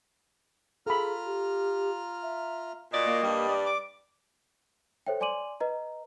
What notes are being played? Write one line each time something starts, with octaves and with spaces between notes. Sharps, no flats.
F4 G#4 A4 A#5 B5 F6
G4
E5
A#2 F#4 D5 D#5
A#3
G2 G3
D5
D6
A4 C5 C#5 E5 G5
D5 G#5 C6 D6 D#7 F#7
B4 D#5 A#5